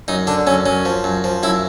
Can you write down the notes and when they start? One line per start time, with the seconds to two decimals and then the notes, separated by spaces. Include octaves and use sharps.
0.08 F#2 D#4
0.27 D3 D4
0.47 F#2 C#4
0.66 F#2 C#4
0.85 F3
1.04 F#2
1.24 F3
1.43 F#2 E4